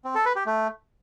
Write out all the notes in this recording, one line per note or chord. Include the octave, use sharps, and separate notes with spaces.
C4
A4
B4
G4
A3